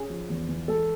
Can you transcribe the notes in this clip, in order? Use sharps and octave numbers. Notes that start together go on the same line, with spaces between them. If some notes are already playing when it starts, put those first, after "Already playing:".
Already playing: C#4 G#4
F3
E2
E3
G#3 A4